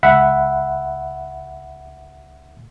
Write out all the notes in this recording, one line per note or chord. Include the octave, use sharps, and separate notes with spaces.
C#2 E5 F#5 B5